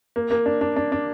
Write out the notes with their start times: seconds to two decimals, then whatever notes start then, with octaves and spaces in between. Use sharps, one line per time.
0.16 A#3
0.31 A#3
0.46 D4
0.61 D4
0.76 D4
0.92 D4